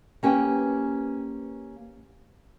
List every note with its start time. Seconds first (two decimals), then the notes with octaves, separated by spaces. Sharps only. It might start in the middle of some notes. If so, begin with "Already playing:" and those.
0.23 A#3 C#4 G4 B4 G5